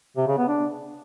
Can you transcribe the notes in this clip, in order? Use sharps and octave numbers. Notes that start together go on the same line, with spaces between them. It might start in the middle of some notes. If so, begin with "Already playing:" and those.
C3
C#3
B3
D4